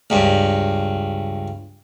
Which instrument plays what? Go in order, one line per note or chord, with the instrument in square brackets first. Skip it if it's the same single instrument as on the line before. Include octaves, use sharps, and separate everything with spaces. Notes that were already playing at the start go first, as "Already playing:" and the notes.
[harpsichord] C#2 G2